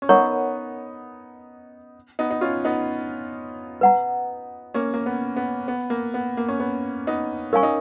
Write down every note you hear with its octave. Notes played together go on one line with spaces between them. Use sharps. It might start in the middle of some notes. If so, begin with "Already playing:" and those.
C#4
B3 D#4 A#4 C#5 F#5 A#5 C#6
B3 D#4
D#4
C#4 F4
B3 D#4
B4 F#5 A#5
A#3 C#4
A#3
B3
B3
B3
A#3
B3
A#3
C#4
B3
B3 D#4
C#4 A#4 F5 G#5 C#6
D#4